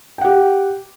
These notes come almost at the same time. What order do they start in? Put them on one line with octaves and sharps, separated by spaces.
G5 F#5 G4